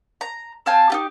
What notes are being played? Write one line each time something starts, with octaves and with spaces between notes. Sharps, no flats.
A#5
C4 F5 G#5 A5
D#4 F4 G4